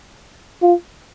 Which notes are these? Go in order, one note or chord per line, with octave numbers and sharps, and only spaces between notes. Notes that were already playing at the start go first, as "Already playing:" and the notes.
F4